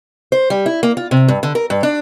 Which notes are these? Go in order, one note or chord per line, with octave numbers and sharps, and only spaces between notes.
C5
G3
E4
A#3
F4
C3
G2
D3
A#4
G2
D4